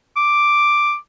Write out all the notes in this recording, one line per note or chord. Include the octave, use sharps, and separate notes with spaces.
D6